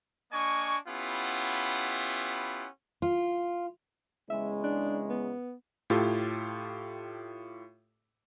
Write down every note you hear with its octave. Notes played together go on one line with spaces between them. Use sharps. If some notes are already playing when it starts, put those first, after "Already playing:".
A#3 D4 D#5 G#5 C#6
B3 C#4 E4 F4 G4 F#5
F4
E2 C#3 G#3 E5
D4
B3
A2 F4 G4 A4